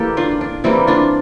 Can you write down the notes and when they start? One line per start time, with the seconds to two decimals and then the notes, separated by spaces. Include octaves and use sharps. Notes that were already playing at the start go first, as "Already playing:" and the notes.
Already playing: E3 G3 A#3 G4 A4
0.17 D4 F4
0.41 D4
0.64 E3 G3 A#3 C4 E4
0.87 D4 F4